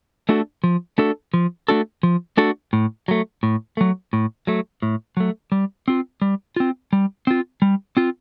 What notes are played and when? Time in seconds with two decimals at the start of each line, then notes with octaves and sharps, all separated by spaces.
0.29 A3 D4 F#4 A4
0.64 F3
0.98 A3 D4 F#4 A4
1.34 F3
1.69 A3 D4 F#4 A4
2.03 F3
2.37 A3 D4 F#4 A4
2.73 A2
3.08 F#3 A3
3.43 A2
3.77 F#3 A3
4.13 A2
4.47 F#3 A3
4.82 A2
5.17 F#3 A3
5.52 G3
5.88 C4 F4
6.22 G3
6.56 C4 F4
6.93 G3
7.27 C4 F4
7.62 G3
7.97 C4 F4